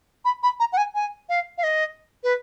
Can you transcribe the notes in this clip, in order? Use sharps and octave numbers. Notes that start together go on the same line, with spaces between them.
B5
B5
A#5
F#5
G#5
G#5
F5
F5
D#5
B4